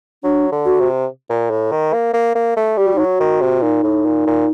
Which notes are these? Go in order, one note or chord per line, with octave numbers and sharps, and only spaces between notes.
F#3 D4
D3
F#4
C3
A#2
A2
D#3
A#3
A#3
A#3
A3
G3 G4
F#4
F#3 D#4
F#4
D#3
C3
A#2 D#4
A2
A#2
A#2